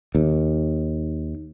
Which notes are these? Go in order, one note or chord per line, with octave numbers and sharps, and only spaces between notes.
D#2